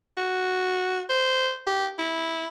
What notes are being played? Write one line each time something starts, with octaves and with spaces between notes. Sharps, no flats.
F#4
C5
G4
E4